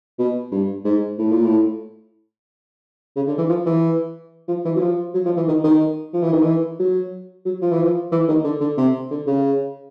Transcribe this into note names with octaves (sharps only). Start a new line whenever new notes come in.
B2
G2
G#2
A2
A#2
A2
C#3
D3
E3
F3
E3
F3
E3
F#3
F3
F#3
F3
E3
D#3
D#3
F3
E3
D#3
E3
F#3
F#3
F3
E3
F3
E3
D#3
D3
D3
C3
D3
C#3